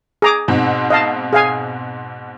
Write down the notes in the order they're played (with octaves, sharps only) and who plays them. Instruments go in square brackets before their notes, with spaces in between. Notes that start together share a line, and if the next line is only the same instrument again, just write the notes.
[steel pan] G#4 A#5 D6
[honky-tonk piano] G#2 B2 C4
[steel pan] D#5 F5 A5
G#4 F5 G#5